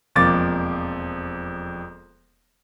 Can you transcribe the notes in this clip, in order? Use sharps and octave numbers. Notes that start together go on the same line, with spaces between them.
E1 F2 F3 A#3 D6 A6